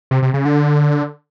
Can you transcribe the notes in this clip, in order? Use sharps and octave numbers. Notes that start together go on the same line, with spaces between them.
C3
C3
C#3
D3